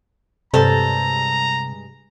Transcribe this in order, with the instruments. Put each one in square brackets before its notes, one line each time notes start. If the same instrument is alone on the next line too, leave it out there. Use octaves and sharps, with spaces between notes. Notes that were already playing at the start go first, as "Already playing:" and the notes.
[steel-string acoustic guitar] G2 G#3 [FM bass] C3 [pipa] G3 A4 C5 [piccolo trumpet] A#5